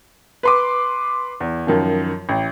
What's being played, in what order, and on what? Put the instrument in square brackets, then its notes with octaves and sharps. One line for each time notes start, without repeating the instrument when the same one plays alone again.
[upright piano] B4 C6 D6
E2
F#2 D#3 F3
A1